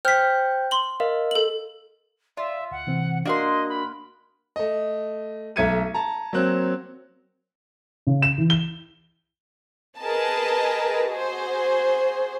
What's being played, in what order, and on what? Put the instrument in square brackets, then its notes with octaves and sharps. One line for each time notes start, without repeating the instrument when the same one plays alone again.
[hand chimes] C5 G5 G6 [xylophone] F6 B6
[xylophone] C6 F#7
[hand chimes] A#4 D#5 F5
[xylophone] A4 F#7
[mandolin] F4 [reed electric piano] D5 [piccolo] E5
[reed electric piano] D2 [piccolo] F#5
[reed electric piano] C3 E3 C4
[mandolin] A#3 F#5 C6 [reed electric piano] D4 F#4 A#4 [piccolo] D#5
[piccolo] B5
[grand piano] A3 D#5
B1 A3 E5 G#6 C#7 D#7
A5 A#5
F#3 A#3 C4 F#6
C#3
E7
E3
G7
[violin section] G#4 A#4 B4 D#5 A5
F#4 G#4 C5